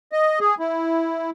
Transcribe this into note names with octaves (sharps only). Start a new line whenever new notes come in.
D#5
G#4
E4